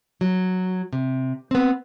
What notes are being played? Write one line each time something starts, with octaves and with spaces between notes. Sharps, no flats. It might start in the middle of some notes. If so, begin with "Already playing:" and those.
F#3
C3
B3 C4